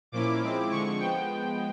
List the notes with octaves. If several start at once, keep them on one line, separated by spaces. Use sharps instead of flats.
A#2 F3 A#3 C#4 E4 D6
F3 G#3 C4 E4
D3 F3 G#3 C#6
F3 G#3 B3 G5